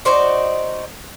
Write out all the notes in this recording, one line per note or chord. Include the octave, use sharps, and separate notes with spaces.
D#4 F#4 C5 D5